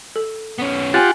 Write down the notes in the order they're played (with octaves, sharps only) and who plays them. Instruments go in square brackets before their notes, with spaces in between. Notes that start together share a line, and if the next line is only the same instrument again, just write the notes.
[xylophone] A4
[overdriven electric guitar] B3 C#4
[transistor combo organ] F4 G4 F#5 [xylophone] G#5 A6